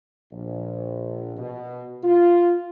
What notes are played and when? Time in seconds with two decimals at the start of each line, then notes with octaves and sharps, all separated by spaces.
0.32 A#1
1.37 B2
2.04 F4